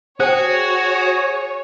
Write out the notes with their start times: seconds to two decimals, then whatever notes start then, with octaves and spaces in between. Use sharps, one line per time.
0.20 F#4 G#4 C5 C#5 G5